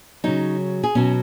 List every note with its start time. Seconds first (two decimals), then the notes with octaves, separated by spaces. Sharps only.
0.24 C#3 F#3 D#4
0.84 G#4
0.95 B2 F#3 C#4